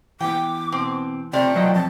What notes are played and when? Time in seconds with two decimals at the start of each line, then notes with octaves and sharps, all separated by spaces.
0.21 E3 B3 G5 D6
0.72 B2 C4
1.33 C3 F3 A3 D5 G5
1.54 B2 F#3 D#5
1.75 F2 A5